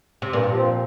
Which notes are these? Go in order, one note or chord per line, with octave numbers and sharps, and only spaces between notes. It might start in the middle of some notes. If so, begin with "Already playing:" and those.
C3
G2 A#2
F3 C4